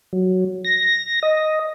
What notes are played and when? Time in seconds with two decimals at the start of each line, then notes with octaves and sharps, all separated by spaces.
0.13 F#3
0.65 A#6
1.23 D#5